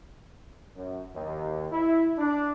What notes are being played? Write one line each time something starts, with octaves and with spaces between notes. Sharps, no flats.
F#2
D#2
E4
D4